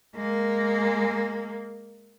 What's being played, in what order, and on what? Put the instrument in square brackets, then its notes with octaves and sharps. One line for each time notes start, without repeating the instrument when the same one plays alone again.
[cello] G#3 A#3